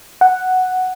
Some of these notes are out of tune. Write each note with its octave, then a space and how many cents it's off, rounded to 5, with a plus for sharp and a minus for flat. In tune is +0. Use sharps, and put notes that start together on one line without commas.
F#5 +0